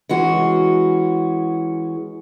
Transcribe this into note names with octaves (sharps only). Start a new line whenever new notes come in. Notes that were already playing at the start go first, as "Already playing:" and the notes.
E3 G#3 C#4 F#4